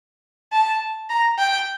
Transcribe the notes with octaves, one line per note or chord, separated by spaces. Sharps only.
A5
A#5
G5